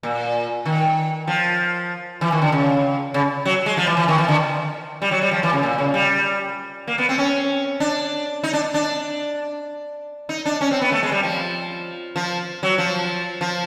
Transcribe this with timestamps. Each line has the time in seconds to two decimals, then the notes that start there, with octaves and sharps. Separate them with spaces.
0.03 A#2
0.65 D#3
1.27 F3
2.21 E3
2.32 D#3
2.42 D3
2.52 C#3
3.14 C#3
3.45 F#3
3.66 G#3
3.77 F3
3.87 E3
3.97 E3
4.08 D#3
4.18 E3
4.28 D3
5.02 G3
5.11 F#3
5.21 G3
5.32 F3
5.43 E3
5.53 C#3
5.63 A#2
5.78 C#3
5.94 G3
6.88 A#3
6.98 B3
7.09 C4
7.18 C#4
7.80 D4
8.43 D#4
8.53 D4
8.74 D4
10.29 D#4
10.45 D4
10.61 C#4
10.71 C4
10.81 B3
10.92 A3
11.03 G#3
11.12 G3
11.23 F3
12.16 F3
12.63 F#3
12.78 F3
13.41 F3